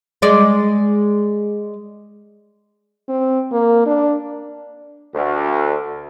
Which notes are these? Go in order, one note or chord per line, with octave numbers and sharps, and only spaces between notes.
G#3 D5
C4
A#3
D4
D2